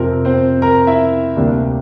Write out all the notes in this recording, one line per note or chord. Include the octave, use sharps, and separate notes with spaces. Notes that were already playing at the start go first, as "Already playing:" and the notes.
Already playing: F2 C3 F3 C4 A#4
C4 C5
A#4 A#5
E4 E5
D2 C3 G3 A#3 D4